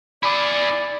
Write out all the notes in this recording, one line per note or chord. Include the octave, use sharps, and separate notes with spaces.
E4 G#4 D5 B5 D6